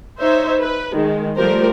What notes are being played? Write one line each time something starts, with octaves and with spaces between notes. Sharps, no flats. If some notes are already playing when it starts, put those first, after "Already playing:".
D#4 C5 C#5 E5
B4
D#3 G#3
F3 G3 A3 G4 A#4 C5